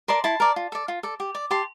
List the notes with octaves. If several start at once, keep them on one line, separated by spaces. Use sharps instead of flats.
A#4 D5 A5 C6
E4 A5 C6
A#4 D5
F4
A4 D5
F4
A4 D5
G4
D5
G4 A5 C6